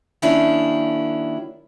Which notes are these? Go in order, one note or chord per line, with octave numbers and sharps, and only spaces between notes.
D#3 F#3 A#3 C#4 D4 E4